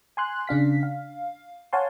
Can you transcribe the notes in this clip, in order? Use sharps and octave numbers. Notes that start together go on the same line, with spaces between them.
G#5 C6 F#6
C#3 D4 F5 B6
F5
C#5 F5 F#5 G#5 A5 C6